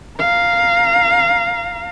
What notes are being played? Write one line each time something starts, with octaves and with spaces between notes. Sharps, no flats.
F5 A#5